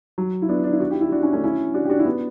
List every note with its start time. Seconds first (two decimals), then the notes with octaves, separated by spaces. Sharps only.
0.18 F#3
0.42 E4
0.49 B3 D4
0.64 D4
0.73 E4
0.80 D4 F#4
0.90 E4 G4
1.01 E4 G4
1.12 D4 F#4
1.23 C#4 E4
1.33 A3 C#4
1.44 C#4 E4
1.74 D4 F#4
1.85 G4
1.89 D4 F#4
1.99 E4
2.05 B3 D4